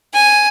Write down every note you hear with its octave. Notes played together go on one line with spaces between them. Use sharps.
G#5